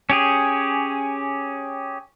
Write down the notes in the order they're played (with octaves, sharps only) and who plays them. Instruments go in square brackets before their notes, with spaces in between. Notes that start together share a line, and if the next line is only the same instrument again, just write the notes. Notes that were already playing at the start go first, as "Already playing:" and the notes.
[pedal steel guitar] C#4 G4 G#4